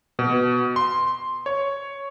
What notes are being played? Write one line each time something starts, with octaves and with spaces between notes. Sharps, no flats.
B2
C6
C#5